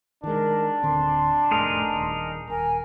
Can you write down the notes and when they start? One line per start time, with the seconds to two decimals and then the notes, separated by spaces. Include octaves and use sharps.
0.24 D#3 G#3 D4 A#4
0.83 D1 D3 C4 C6
1.51 F1 A2 A3 D#4 G#4 A#4
1.96 D#1
2.50 D#1 A#4 G#5